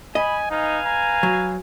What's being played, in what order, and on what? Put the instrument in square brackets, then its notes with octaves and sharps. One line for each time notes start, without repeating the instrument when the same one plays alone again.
[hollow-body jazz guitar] D#5 [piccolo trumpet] G#5 [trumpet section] B5
[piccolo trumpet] D#4 [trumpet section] B4 F5 G#5
[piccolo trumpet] A#5
[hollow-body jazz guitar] F#3